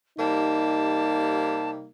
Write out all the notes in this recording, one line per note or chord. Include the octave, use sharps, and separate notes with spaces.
C3 G3 A#3 D#4 A5